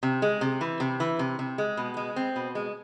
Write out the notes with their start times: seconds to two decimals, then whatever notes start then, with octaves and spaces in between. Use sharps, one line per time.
0.03 C3
0.22 G#3
0.41 C3
0.61 E3
0.80 C3
1.00 E3
1.19 C3
1.39 C3
1.58 G#3
1.77 B2
1.97 G#3
2.16 C4
2.36 B2
2.55 G#3